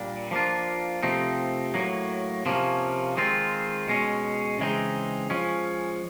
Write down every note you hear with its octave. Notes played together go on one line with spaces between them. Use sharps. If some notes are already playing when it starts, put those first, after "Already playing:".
Already playing: A#2 G3 A#3 D4
F3 A#3 D4 F4
C3 F3 A3 C4 D#4
A2 F#3 A#3
C3 F3 A#3 C#4
D#3 G#3 C4 F4
B2 G#3 C#4
C#3 E3 G#3 C4 D#4
F3 G#3 C#4